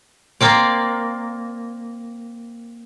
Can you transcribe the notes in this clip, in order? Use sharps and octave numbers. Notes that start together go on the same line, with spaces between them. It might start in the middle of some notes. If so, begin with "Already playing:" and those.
A#3 C4 D5